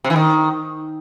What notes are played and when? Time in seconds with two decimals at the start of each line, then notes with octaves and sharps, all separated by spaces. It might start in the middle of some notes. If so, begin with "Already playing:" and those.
0.04 C3
0.10 E3
0.16 D#3